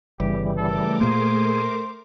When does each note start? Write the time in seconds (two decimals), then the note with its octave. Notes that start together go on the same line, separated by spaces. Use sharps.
0.20 G1 C#3 E3 G3 G4
0.57 A3 A4 A#4 D6
1.01 A#2 A#3 G#4 C5